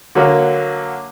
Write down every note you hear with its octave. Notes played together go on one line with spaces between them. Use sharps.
D3 F#3 A#3